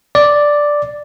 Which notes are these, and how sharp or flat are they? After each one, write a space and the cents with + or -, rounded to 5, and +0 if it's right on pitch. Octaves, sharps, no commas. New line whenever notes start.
D5 +0